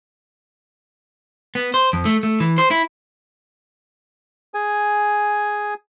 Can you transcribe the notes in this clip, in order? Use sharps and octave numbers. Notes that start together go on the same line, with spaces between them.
B3
C5
F2
A3
A3
E3
C5
E4
G#4 G#5